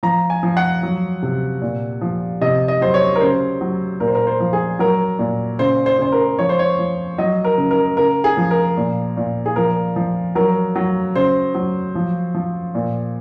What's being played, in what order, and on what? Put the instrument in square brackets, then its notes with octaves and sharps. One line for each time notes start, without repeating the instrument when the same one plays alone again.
[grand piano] F3 A#5
G#5
F3
F#5
F#3
C3
A#2
F3
C3 D#5
D#5
F#3 C5
C#5
A#4
C#3 C5
F#3
A#2 A#4
C5
A#4
C5
F3
G#4
F#3 A#4
A#2
C#3 C5
C5
C#3 C5
A#4
F3 C#5
C5
C#5
F3
F#3 D#5
A#4
C#3
A#4
C#3 A#4
G#4
F3
A#4
A#2
A#2
G#4
F3 A#4
F3
F#3 A#4
F#3
C#3 C5
F#3
F3
F3
A#2